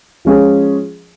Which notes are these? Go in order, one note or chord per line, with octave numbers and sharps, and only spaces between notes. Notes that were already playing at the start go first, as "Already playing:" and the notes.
F3 G#3 C#4 F4 G#4